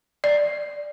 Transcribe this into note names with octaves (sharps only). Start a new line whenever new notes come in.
D5